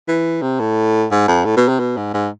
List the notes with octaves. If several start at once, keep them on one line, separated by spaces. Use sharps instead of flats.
E3
C3
A2
G#2
F2
A2
B2
C3
B2
G#2
G#2